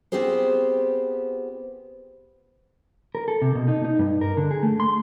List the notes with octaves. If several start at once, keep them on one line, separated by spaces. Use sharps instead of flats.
B3 C4 F4 G4 G#4 C5
A#4
A4
C3
B2
D#4
D#4
G2
A#4
D3
G#4
A3
C6